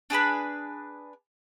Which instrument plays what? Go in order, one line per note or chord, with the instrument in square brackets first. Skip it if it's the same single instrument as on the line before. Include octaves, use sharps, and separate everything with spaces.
[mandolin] D4 G#4 B4 B5